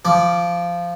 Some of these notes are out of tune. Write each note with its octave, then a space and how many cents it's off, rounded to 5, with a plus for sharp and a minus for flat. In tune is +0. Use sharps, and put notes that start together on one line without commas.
F3 -10 D6 +0